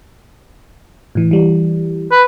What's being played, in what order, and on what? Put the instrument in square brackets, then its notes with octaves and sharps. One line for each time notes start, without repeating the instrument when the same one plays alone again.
[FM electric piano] A2 E3
E3 G3
[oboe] B4